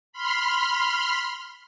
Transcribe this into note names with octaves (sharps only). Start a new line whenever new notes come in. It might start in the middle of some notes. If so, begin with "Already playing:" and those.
B5 C6 F6